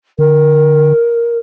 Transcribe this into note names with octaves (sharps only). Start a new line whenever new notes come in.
D3 A#4